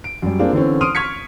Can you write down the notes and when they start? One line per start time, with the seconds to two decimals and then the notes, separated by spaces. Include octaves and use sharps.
0.04 D7
0.22 F#2 G3
0.39 A#3 C4 D4 F4 G#4
0.53 D3 E3 C4 C#4
0.81 C6 D#6 F6 D7 D#7
0.95 C#6 F6 G#6 B6 C#7